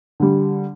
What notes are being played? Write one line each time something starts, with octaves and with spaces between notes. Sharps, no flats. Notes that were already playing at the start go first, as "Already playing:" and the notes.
D3 G3